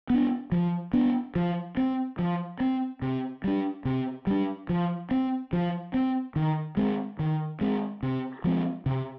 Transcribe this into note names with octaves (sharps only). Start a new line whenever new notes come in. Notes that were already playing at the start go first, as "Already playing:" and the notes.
B3 D4
F3
B3 D4
F3
C4
F3
C4
C3
G3 D4
C3
G3 D4
F3
C4
F3
C4
D#3
G#3 C4
D#3
G#3 C4
C3
F3 G#3 C4
C3